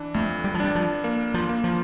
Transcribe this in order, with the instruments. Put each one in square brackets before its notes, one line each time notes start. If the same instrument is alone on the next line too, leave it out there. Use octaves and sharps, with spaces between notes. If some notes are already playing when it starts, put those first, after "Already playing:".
Already playing: [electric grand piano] E3 D4
[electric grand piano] F2 [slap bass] A3
[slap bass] G3
F3
[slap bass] G3 [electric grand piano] D4
[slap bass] F3
[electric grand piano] A#3
[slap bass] F3
[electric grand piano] A#3
[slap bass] F3